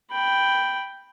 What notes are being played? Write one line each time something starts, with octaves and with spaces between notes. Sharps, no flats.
G5 B5